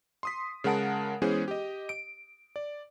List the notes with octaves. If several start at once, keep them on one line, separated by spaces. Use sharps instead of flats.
C6 D#6 B6
C#3 G#3 A#4 F#5 A5 D7
E3 G#3 B3 C#4 G#4 C5
G4 D#5
D7
D5